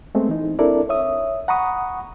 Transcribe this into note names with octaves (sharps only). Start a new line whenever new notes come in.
G#3 A3 B3 C4
E3 D#4
C4 D4 E4 A4 A#4 D5
C#5 E5 D#6
F#5 A#5 B5 C#6 D#6